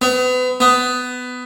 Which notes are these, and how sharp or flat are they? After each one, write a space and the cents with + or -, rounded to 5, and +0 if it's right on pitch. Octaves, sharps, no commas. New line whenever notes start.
B3 +35
B3 +15